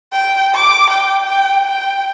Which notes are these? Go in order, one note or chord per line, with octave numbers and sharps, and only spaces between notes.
G5
D6
G5
G5
G5